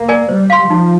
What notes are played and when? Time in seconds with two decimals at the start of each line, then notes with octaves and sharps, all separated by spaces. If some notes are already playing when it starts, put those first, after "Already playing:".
Already playing: A#3
0.08 A#4 D5 G#5
0.29 G3 C5
0.50 F5 C6
0.69 F3 D#4